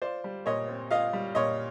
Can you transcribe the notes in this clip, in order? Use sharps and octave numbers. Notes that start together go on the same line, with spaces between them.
F4 C5 D5
G3
A#2 C#5 D#5
C4
F4 D#5 F5
G3
A#2 C#5 D#5